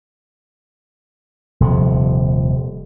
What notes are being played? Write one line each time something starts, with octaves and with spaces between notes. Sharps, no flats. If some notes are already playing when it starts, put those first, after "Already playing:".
D#1 C3 F3